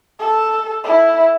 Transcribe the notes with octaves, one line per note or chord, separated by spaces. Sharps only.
A4
E4